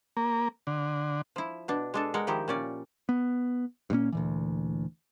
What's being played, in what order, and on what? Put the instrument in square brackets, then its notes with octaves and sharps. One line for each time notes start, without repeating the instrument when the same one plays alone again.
[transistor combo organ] A#3
D3
[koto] F3 E4
B2 D4
G#3 D4 A4
G#3 A#4 F#5
D#3 F3 D#4 E4 G4
A#2 C#4 D5
[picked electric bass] B3
G2 A#2 A#3 C#4
D2 A#2 E3